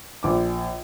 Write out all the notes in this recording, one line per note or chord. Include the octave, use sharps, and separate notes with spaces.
A#1 D6